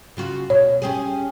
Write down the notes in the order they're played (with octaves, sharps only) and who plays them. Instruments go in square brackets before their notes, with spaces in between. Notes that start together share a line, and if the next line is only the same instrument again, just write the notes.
[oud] C#3 F4 F#4
[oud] B2 [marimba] C#5
[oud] C#4 G4 G#4